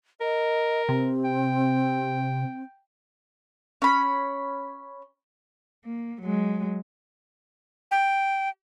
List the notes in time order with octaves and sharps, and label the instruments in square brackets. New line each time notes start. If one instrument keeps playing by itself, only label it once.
[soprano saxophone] A#4 [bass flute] D#5
[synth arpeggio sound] C3 [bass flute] C4
[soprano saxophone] G5
[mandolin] C#4 B5
[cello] A#3
F#3 G#3
[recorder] G5